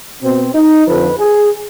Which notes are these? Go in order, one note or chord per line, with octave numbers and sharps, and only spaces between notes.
B2 C4
D#4
F2 D3 F3 B4
G#4